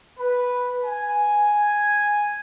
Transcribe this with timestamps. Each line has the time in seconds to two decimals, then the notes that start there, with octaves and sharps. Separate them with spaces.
0.19 B4
0.84 G#5